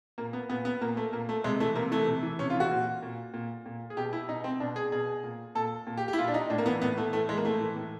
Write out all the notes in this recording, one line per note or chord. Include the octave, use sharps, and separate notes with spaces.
A#2 A#3
B3
A#2 B3
B3
A#2 A#3
A3
A#2 A#3
A3
C3 G#3
E3 A3
C3 A#3
E3 A3
C3
E3
C3 C#4
F4
E3
F#4
A#2
A#2
A#2
A#2
G#4
B2 G4
E4
B2 D#4
C4
B2 D4
G#4
B2 G#4
A#2
A#2 A4
A#2
G4
G4
E4
A#2 F4
D4
D#4
A2 D4
A#3
E3 B3
A2 B3
E3 A3
A2 A3
E3 G#3
A#3
A2 A3
E3
A2